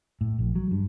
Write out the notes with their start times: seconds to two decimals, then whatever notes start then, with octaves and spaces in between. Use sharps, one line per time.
0.21 A2
0.39 A#1
0.56 F#3
0.71 G2